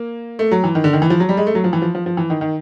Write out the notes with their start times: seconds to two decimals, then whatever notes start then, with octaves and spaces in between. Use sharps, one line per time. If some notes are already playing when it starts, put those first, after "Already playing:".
Already playing: A#3
0.39 A3
0.52 F#3
0.64 E3
0.75 D#3
0.84 D3
0.93 D#3
1.02 E3
1.10 F3
1.20 F#3
1.29 G3
1.37 G#3
1.47 A3
1.55 F#3
1.64 F3
1.73 E3
1.82 F3
1.95 F3
2.06 F3
2.17 E3
2.30 D#3
2.41 D#3